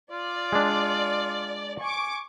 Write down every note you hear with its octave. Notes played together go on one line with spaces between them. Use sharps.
F4 D5
G#3 D4
G#5 C#6 D6